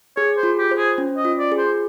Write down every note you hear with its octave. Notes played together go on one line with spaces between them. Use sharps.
G#4 C#5
C5
F4
G4
C5
G#4
C#4
D#5
F4
D5
G#4
C5